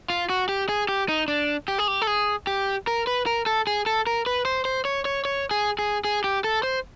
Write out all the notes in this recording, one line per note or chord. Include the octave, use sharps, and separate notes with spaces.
F4
F#4
G4
G#4
G4
D#4
D4
G4
G#4
G4
A4
G#4
G4
A#4
B4
A#4
A4
G#4
A4
A#4
B4
C5
C5
C#5
C#5
C#5
G#4
G#4
G#4
G4
A4
C5